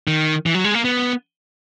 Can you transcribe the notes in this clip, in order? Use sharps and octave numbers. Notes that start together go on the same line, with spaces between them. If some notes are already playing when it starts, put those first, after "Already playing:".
D#3
E3
F#3
G#3
A#3
B3